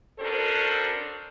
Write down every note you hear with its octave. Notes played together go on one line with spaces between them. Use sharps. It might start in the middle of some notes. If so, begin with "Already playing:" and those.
C#4 D4 F#4 A4 A#4 C5